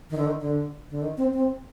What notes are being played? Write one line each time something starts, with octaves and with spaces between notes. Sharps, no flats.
D#3
D3
D#3
D3
D3
D#3
C4
C4